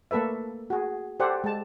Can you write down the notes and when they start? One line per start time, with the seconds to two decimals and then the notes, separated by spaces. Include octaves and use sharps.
0.11 A3 A#3 A4 B4 E5
0.70 F#4 G#4
1.20 G4 A4 C5 D5 F#5
1.44 G#3 A5